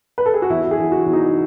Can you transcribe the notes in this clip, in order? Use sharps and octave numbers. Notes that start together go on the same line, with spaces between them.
B4
A4
G#4
F#4
E2 E4
G#4
E2
F#4
E2
D#4